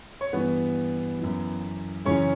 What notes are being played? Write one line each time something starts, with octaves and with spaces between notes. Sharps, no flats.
C#5
G2 E3 B3 B4
F#2 E3
F#2 C#3 E3 C#4 C#5